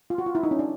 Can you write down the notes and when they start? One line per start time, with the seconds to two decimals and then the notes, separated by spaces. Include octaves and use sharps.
0.10 F4
0.18 F#4
0.26 F4
0.35 E4
0.43 D#4
0.51 C#4
0.59 D4